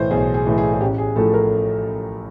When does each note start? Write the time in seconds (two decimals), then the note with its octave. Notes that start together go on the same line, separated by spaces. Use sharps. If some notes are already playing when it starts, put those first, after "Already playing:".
Already playing: B1 A2 E3 A4 C5
0.11 B1 G#4
0.34 G#4
0.46 A2 E3
0.58 G#4
0.73 G#4
0.81 A1 G4
0.98 G#4
1.16 A2 F3 A3 A4
1.34 A#4